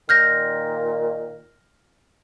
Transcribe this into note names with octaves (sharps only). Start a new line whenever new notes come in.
A#2 D#3 F6 G6 A#6